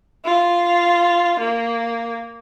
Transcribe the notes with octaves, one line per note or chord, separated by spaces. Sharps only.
F4 F5
A#3